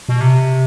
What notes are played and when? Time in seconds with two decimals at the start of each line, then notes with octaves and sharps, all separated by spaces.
0.09 B2
0.21 C3